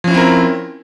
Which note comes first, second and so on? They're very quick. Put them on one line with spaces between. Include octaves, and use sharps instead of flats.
F3 C#4 E4 C4 A#4